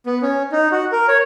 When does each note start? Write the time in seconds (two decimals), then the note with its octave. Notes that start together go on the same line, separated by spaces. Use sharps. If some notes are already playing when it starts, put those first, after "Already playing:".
0.06 B3
0.22 C#4
0.52 D#4
0.72 F#4
0.92 A#4
1.08 C#5